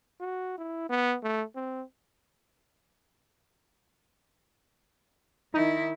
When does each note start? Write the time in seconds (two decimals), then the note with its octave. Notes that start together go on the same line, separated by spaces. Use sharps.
0.21 F#4
0.58 E4
0.90 B3
1.23 A3
1.56 C4
5.54 D#3 D#4 E4